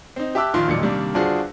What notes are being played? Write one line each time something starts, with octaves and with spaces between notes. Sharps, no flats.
C4 D#4
G4 E5 A5 D6 E6 F#6
A#1 D#3 F4 C6
E1 B1 A#2 D#4 D5 C#7
C3 D#3 G3 A#3 D4
G1 D4 F4 F#4 G#4 C5